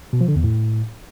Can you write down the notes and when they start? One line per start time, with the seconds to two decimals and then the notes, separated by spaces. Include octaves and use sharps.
0.13 B2
0.21 F3
0.28 D3
0.36 E2
0.44 A2